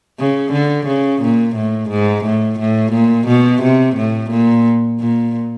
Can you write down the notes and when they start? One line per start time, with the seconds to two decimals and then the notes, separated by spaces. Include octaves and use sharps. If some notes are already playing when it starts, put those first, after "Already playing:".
0.19 C#3
0.53 D3
0.87 C#3
1.22 A#2
1.56 A2
1.90 G#2
2.25 A2
2.60 A2
2.93 A#2
3.28 B2
3.63 C3
3.96 A2
4.31 A#2
5.00 A#2